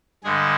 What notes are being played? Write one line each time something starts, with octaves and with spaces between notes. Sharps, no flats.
G2 D3 G#3 G#4